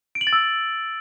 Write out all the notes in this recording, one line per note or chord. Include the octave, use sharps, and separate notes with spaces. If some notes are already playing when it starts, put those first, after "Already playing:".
D7
F#7
A6
E6